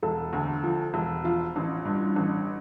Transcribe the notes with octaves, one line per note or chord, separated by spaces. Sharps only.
E1 A4
D2
F3
E1
F3 F4
A1
G2
A1